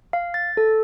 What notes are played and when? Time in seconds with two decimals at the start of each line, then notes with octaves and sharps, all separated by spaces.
0.13 F5
0.34 A6
0.57 A4